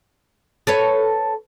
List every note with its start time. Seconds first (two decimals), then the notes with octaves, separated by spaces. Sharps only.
0.67 A4 B4 C#5